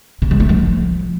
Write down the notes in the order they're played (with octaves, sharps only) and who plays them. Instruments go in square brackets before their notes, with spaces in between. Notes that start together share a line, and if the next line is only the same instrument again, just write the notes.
[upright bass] C#3
G#3
A3
F3